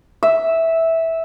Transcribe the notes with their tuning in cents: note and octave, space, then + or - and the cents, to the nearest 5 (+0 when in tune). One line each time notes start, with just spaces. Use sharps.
E5 -10